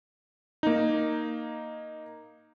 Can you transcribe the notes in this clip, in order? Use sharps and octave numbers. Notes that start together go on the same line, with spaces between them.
A#3 D#4